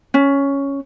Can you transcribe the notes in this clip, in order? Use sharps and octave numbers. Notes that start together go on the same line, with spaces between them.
C#4